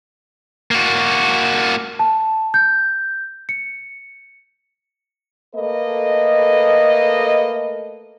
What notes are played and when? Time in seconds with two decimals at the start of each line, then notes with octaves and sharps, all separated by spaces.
0.71 A#3 F#4
1.99 A5
2.54 G6
3.49 C#7
5.54 A3 A#3 A4 B4 D#5